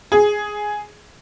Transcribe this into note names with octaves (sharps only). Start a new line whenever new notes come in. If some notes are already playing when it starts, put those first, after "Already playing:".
G#4